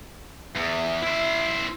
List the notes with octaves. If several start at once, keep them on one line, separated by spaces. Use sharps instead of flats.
E2 E5
E4 C5